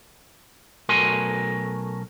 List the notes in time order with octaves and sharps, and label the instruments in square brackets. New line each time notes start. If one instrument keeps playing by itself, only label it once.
[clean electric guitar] B1 A3 F#4 A#4 G#5 C6